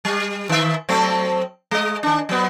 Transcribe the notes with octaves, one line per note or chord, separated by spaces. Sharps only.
G3
D#3 E5
F#3 A3 C4
G#3 D#5
D#3 D4
F#3 B3